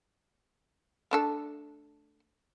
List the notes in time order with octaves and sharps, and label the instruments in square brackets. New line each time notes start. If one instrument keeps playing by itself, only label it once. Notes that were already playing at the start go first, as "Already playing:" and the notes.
[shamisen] A3 D4 A4